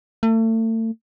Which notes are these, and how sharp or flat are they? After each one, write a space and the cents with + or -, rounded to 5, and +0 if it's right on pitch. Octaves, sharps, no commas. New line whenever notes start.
A3 +35